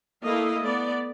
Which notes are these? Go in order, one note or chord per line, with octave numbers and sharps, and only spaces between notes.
A3 A#3 E4 D#5 F5
A3 B3 D5